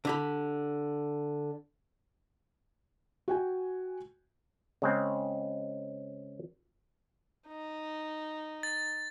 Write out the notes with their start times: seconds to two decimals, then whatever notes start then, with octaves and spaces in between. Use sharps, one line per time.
0.05 D3 G4 B5
3.28 F#4 G5 G#5
4.82 C#3 G#3 C4
7.47 D#4
8.63 A6